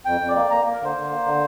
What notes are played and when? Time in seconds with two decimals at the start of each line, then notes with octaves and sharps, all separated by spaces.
0.05 F2 G5
0.21 F2
0.29 D5
0.36 A#3
0.50 A#3 A#5
0.66 A#3
0.74 A#4
0.81 D3 C5
0.96 D3
1.11 A#3
1.26 D3